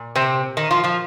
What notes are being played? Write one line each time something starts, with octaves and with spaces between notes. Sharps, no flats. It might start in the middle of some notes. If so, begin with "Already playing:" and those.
Already playing: A#2
C3 C4
D#3 D#4
F3 F4
F3 F4